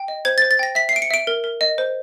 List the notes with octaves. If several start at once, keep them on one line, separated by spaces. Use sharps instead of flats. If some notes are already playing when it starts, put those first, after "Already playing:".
Already playing: G5
D#5
C5 G#6
A6
C5
A6
G5 A#6
E5 B6
C7
E5 D7
C#7
E5 D7
A#4
A#4
D#5
C5